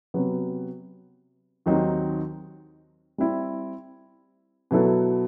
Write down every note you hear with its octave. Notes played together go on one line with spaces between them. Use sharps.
C3 F#3 B3
D#2 D#3 F#3 C4 D#4
G3 C4 E4
B2 F#3 B3 E4 A4